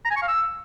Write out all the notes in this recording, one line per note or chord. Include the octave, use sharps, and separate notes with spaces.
A#5
G#5
C#6
F5
E6